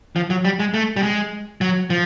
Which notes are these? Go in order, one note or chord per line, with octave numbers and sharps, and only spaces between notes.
F3
F#3
G3
G#3
A3
G3
G#3
F#3
F3